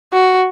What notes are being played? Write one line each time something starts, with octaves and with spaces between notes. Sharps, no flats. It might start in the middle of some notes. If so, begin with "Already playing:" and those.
F#4